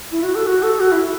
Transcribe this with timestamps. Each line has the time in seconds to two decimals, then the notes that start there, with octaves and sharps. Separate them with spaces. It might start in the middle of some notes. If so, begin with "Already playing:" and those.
0.11 E4
0.23 F#4
0.35 A4
0.47 F#4
0.63 A4
0.80 F#4
0.92 E4